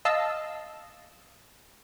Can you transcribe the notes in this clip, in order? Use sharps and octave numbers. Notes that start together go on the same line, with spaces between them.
D#5 F5 A5 E6